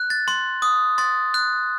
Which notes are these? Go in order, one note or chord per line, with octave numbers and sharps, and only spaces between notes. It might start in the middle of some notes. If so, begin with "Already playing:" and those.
Already playing: F#6
A6
C6
D#6
C6 A6
F#6